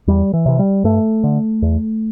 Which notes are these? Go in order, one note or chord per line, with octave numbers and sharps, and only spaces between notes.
E2 G3
E3
C3 E3
G3
G2 A3
D3
E2